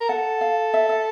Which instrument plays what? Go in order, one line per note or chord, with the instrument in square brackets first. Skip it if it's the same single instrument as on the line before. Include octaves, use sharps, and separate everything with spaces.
[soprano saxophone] A#4
[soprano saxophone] A4 [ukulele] F#5
[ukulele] F5
E5
E5